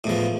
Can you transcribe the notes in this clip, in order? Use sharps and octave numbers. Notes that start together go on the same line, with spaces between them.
E2 A2 F3